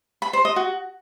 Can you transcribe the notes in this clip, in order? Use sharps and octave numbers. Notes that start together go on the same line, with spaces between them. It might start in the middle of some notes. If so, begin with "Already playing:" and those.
B5
C5
D#5
F#4